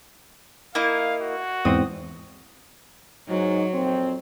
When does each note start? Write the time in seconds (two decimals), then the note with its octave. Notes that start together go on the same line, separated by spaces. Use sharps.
0.75 A#3 E4 D#5 F5
1.22 F#4
1.65 E2 G#2 C4 D#6
3.29 G#2 F#3 D#4
3.73 F2 A#2 C4